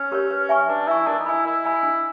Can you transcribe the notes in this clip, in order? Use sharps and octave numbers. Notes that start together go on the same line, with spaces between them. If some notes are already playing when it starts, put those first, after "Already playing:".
Already playing: C#4
G4 A#4 C#5
B4
E5 G#5 C#6
D4 B4
E4 E5 G#5 C#6
D4 A#4
D#4
E4 D#5 G#5 B5
E4 A#4
D#5 G#5 B5
D4